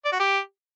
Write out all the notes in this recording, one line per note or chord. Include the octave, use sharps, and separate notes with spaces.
D5
F#4
G4